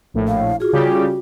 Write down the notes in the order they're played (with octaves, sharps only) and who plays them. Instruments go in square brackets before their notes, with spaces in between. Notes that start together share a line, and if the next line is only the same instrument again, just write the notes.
[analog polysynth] A#1 A2
[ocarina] F5
[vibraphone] F4 G#4 [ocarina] F#4
[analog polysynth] C#3 G3 G4